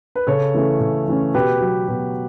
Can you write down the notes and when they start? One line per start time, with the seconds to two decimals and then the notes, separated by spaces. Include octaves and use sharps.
0.16 B4
0.27 C#3 A4 C#5
0.54 E3 A3 C#4
0.81 C#3
1.08 E3 A3 C#4
1.34 B2 G4 B4
1.61 F#3 B3
1.88 B2